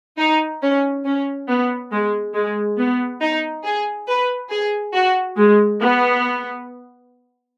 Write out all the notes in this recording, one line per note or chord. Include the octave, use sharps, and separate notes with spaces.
D#4
C#4
C#4
B3
G#3
G#3
B3
D#4
G#4
B4
G#4
F#4
G#3
B3